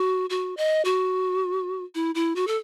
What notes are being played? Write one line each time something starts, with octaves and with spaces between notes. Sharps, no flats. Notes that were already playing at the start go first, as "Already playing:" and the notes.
Already playing: F#4
F#4
D#5
F#4
E4
E4
F#4
A4